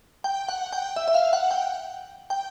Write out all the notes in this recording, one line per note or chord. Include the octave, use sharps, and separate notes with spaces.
G5
F#5
G5
E5
E5
F5
F#5
G5
G5